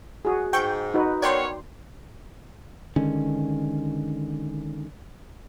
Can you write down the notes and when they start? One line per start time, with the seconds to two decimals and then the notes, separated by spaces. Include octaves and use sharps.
0.25 F#4 G#4
0.53 G#2 G5 C#6 G6
0.94 D#4 F#4 B4
1.22 B3 A#4 C#5 D5 G5 C6
2.96 D3 D#3 G#3 C#4